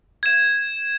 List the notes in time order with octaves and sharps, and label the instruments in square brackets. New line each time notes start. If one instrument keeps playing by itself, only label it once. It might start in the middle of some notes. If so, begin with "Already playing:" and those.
[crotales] G#6 E7